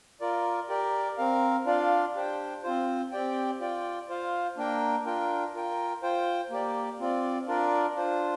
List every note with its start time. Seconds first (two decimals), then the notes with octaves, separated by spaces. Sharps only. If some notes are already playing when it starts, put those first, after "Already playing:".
0.21 F4 A#4 D5
0.69 G4 A#4 D5
1.17 C4 A#4 F5
1.66 D4 F4 D5 F5
2.15 D4 G4 C5 G5
2.63 C4 F4 C5
3.12 C4 G4 D5 G5
3.60 F4 D5 G5
4.09 F4 C5 F5
4.57 A#3 D4 A#4 G5
5.05 D4 F4 A#4 G5
5.54 F4 A#4 G5
6.02 F4 C5 G5
6.50 A#3 G4 D5
7.00 C4 F4 D5
7.48 D4 F4 A#4 D5
7.96 D4 F4 C5